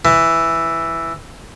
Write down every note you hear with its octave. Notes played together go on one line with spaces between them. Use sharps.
E3